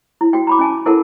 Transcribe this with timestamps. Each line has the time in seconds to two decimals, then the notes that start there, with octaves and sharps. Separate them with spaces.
0.21 E4
0.33 F#4 G5
0.47 A#5 B5 D6
0.59 C#4 G#5 A5
0.86 E4 A4 A#4 F#5 A5